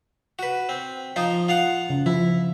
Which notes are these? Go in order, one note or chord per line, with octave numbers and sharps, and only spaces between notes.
F#4 B4
C4
F3 D#4 F4
F4 F5 F#5
C#3
F3 E4